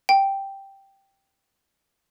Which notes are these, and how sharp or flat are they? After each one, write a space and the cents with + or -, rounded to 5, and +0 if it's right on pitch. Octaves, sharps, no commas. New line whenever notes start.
G5 +0